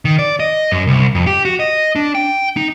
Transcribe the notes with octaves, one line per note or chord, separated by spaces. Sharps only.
D#3
D5
D#5
F#2
C2
F2
G4
F#4
D#5
D4
G5
D#4